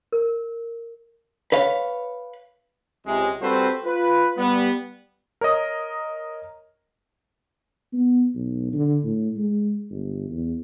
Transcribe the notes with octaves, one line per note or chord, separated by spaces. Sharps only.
A#4
B4 C#5 F5
C#2 C3 G#3
G3 C4 F#4 A4 B4 C5
F4 B4
G3 B3
A#4 C#5 D#5 D#6
B3
B1
D3
A2
G#3
G1
E2